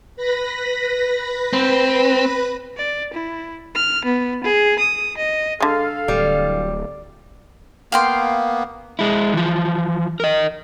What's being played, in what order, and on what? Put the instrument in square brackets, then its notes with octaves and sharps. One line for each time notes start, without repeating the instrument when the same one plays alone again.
[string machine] B4 B5 A#6
[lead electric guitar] C4
[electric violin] D5
E4
F6
B3
G#4
D#6
D#5
[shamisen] D3 G#3 [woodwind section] A4 F5
[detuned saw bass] D1 [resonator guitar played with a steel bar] G3
[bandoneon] A#3 B3 [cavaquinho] F5 G5 C6
[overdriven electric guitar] G#3 E4
E3 F3
A#4 D#5